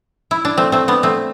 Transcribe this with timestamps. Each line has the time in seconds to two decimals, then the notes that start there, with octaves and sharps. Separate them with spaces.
0.31 E4
0.45 D4
0.57 A3 C4
0.72 A3 C4
0.88 B3 D4
1.03 A3 C4